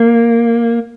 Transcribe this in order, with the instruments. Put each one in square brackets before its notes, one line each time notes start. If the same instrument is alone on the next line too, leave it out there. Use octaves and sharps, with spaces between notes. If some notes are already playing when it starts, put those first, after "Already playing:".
Already playing: [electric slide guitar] A#3